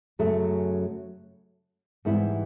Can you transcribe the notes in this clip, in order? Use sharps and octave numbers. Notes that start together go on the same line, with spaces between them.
F#2 C#3 F#3 A3
G#2 E3 G3 B3 E4